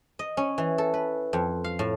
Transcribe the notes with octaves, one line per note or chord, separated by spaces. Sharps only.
D#5
C#4
E3
A4
B4
F2
F5
A2